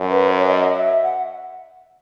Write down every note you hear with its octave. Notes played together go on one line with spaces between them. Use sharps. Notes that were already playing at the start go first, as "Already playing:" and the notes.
Already playing: F#2
B4
C#5
C#5
D#5
E5
F#5